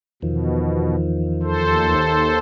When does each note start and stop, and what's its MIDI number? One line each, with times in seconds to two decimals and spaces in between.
0.23 1.95 40
0.23 0.95 47
0.23 1.95 51
0.23 1.95 53
1.43 2.38 39
1.43 2.38 69
1.43 2.38 72